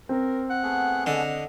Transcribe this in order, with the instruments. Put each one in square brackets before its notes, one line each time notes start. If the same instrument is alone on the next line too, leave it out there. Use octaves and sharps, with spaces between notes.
[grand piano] C4 [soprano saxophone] A#4
[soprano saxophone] F#5
[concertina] A3 B3 G#4
[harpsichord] D3 [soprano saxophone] D#5